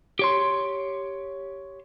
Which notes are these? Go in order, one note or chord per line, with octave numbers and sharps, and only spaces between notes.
G4 C#5 C6